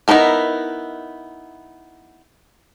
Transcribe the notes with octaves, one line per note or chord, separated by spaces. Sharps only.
B3 D#4 E4 A4 A#4